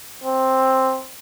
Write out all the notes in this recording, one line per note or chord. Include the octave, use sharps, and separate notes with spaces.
C4